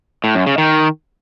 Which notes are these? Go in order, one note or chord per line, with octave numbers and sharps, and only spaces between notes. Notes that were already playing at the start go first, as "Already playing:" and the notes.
A2
F#2
C#3
D#3